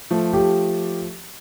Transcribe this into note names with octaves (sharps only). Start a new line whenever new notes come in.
F3 A3
G4